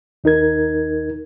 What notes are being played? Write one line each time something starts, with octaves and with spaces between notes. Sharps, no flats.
D#2 D#4 A#4 G#6